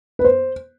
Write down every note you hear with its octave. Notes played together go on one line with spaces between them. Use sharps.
B4
C5